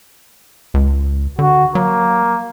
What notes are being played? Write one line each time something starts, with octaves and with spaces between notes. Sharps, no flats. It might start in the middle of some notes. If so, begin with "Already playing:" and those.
C#2
D3 F#4
F#3 A#3